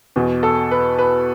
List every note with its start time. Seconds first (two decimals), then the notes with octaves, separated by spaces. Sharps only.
0.16 E2 B2
0.43 A4
0.71 B4
0.99 B4